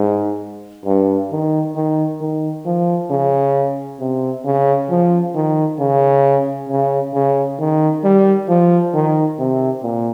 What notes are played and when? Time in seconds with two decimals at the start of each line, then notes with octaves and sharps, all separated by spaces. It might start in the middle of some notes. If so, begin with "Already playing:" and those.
Already playing: G#2
0.86 G2
1.31 D#3
1.75 D#3
2.21 D#3
2.65 F3
3.10 C#3
4.00 C3
4.45 C#3
4.90 F3
5.34 D#3
5.79 C#3
6.69 C#3
7.14 C#3
7.59 D#3
8.04 G3
8.49 F3
8.94 D#3
9.39 C3
9.83 A#2